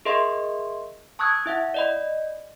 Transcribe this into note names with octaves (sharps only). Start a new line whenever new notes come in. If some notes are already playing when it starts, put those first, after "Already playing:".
G#4 A#4 D#5 E5 C6 C#6
A5 C#6 D#6 E6 F#6 G#6
E4 E5 F#5
D5 D#5 B5